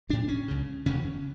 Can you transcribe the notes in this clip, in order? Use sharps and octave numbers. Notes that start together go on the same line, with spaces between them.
B1 A2 D4
C#4
C#2 C#3
E1 D2 C#3 C#4